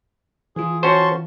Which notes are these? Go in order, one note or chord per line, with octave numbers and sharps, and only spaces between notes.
E3 F4 G#4
C#4 F#4 C5 A5 C6 C#6